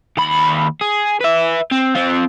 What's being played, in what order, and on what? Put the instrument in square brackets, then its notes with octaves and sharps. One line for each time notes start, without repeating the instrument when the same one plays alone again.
[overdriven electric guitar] D#2 B5
G#4
B4 E5
C4
C4 F4